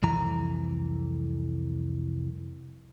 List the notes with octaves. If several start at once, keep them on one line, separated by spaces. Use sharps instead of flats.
C2 F2 E3 A#5